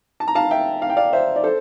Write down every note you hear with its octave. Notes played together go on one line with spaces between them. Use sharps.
A5
A#5
F5 A5
E5 G5
F5
G5
D5 F5
C5 E5
D5
A4 C5